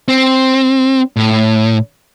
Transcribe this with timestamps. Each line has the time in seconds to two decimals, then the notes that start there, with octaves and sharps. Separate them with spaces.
0.08 C4
1.17 A2